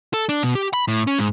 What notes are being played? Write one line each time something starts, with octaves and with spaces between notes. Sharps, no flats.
A4
D4
B2
G4
B5
A2
C#4
G#2